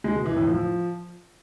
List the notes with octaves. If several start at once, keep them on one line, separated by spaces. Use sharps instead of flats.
G#3
B2
E3
A2
F3